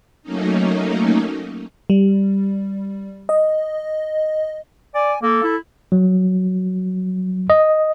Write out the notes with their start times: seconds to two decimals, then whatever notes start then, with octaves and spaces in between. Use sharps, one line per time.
0.23 F#3 A3 A#3 C#4 D#4
1.90 G3
3.29 D#5
4.94 D5 G#5
5.22 A#3 A4
5.43 E4
5.92 F#3
7.50 D#5